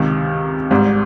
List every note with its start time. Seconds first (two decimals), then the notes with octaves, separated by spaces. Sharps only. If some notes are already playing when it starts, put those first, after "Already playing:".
Already playing: C#2 C3 D#3
0.71 G#1 G#2 G3